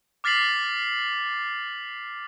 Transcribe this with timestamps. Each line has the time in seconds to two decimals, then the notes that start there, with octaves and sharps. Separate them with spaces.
0.24 D6 F6 A6 B6 C7 F#7